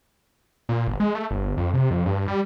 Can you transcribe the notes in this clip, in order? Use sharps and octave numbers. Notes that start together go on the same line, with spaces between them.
A#2
G1
G#3
A3
G1
F2
C3
F2
G2
G3